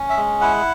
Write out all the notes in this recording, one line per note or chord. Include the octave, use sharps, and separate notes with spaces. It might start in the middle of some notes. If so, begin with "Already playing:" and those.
Already playing: C#4
E5
G#3
E4 F#5